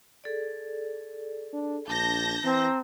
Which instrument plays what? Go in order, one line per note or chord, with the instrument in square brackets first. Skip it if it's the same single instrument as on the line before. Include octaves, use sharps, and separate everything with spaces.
[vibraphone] G#4 A4 D5
[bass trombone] D4
[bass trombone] A#1 [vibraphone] D4 [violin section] A5 G6 A#6
[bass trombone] E3 [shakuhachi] C4 [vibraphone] A#5